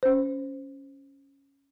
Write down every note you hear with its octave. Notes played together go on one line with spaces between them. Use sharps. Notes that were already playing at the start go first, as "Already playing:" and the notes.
C#4 C5